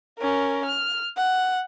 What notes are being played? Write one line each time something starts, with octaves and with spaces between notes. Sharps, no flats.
C#4 A#4
F6
F#5